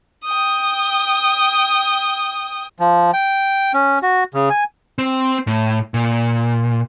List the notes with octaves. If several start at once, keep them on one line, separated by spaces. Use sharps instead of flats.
G5 D#6
F3
G5
C#4
F#4
C#3
G#5
C4
A2
A#2